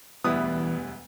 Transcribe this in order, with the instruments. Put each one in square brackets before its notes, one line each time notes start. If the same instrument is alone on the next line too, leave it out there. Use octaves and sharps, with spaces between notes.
[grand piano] E1 D2 G3 [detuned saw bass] E3 [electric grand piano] B3 [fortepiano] E4 B4 D#6